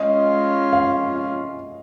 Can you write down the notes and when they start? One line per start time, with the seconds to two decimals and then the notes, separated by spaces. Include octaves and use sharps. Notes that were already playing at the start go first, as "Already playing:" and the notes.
Already playing: G#3 C#4 F4 D#5
0.73 F5